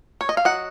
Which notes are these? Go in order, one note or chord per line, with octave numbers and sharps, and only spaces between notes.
C#5
D#5
F5
F#3 D#5 F#5